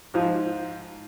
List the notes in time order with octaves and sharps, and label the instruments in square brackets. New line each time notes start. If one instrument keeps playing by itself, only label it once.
[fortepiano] G#2 F3